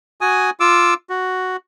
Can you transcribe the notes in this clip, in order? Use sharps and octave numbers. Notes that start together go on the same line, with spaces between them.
F#4 G#5 D#6
F4 D6 E6
F#4